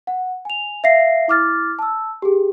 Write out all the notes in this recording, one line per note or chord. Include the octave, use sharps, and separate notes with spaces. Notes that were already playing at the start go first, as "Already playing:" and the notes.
F#5
G#5 F7
E5 F5 A#6 C7
E4 D6 F6 A6
A5 E6
G4 G#4